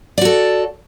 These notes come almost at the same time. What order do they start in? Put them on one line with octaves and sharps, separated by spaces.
D5 F#4 A4